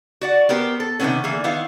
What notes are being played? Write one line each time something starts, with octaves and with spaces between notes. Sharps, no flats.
F#4 D5 F#5
B3 F#4 G4 A#4 C5
A4
C3 D#3 E3 A3 B3 C#4
D3 E3 A#3 G#4
D#3 B3 E4 F5